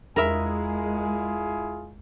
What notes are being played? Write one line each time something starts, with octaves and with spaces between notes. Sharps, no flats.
E2 G#3 E4 F4 G#4 A#4 E5 B5